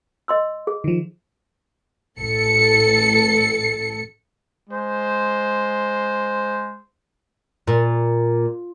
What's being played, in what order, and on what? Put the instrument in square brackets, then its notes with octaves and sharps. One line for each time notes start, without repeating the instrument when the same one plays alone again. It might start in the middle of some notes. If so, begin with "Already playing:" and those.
[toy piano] D#5 C6 E6
G#4
[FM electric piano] D#3 F3
[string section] A1 A4 C#7
[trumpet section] G#3 C5
[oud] A#2